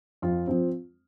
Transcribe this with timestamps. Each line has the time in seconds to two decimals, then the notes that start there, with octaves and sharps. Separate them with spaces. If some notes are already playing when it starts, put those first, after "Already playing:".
0.22 F2 F4
0.47 F3 C4